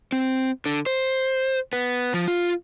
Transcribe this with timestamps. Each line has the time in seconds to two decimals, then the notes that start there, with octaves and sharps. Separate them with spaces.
0.12 C4
0.66 D3
0.86 C5
1.73 B3
2.14 F3
2.28 F4